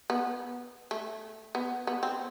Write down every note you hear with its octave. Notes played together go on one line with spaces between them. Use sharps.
B3
A3
B3
B3
C4